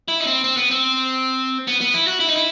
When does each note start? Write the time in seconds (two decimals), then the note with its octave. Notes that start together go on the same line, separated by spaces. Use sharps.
0.08 E4
0.20 D#4
0.27 C4
0.44 C4
0.57 B3
0.71 C4
1.67 B3
1.81 B3
1.94 E4
2.07 F#4
2.20 E4
2.28 D#4
2.36 E4